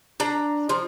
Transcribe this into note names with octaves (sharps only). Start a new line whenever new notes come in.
D4 A#5
F3